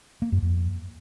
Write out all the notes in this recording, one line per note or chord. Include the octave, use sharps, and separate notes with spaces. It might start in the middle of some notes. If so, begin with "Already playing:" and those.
A#3
F#2
F2